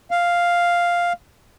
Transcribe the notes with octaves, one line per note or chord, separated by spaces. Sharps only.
F5